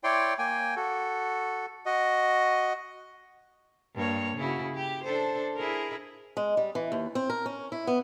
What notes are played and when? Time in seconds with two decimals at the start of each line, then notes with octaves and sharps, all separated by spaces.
0.04 E4 C#5 D5 G5 C6
0.39 A#3 G5 G#5
0.76 F#4 A4
1.86 F#4 D#5
3.95 G2 A#3 C#5
4.37 C#3 E4 F#4
4.75 G4
5.04 D4 A4 C5
5.56 E4 G#4 A#4
6.37 G#3
6.57 G3
6.75 E3
6.92 D#2
7.15 C4
7.29 A#4
7.46 C#4
7.72 E4
7.87 B3